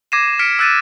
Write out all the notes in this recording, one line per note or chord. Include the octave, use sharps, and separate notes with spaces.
D6 G#6 A#6 C7 D#7 E7
F6 B6 C#7 D7
E6 F#6 A6 D#7 E7